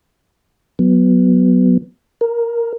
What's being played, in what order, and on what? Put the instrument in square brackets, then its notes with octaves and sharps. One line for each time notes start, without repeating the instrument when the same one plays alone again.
[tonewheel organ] F#3 B3
A#4